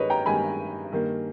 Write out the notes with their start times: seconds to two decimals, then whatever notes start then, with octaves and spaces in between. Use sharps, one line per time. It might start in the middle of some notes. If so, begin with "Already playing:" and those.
Already playing: G2 D#3 G#3 A#4 B4 C#5 D#5
0.10 G5 A#5
0.26 G2 D#3 G#3 G#5 B5
0.92 G2 D#3 A#3